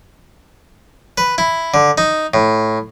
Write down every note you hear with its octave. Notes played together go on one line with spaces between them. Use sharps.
B4
E4
D3
D#4
A2